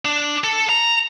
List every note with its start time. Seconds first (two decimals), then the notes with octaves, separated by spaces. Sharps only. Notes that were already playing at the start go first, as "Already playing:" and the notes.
0.05 D4
0.44 A4
0.69 A#5